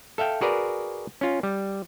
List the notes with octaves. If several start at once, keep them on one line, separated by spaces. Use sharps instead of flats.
A4 E5 F5 G5
F#4 G#4 A#4 B4 D5
C#4 F4
G3